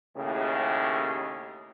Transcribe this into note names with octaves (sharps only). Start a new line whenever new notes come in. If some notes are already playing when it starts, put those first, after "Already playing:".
D#2 A2 C#3